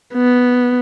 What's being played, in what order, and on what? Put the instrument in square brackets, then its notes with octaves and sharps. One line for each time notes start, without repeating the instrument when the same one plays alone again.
[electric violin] B3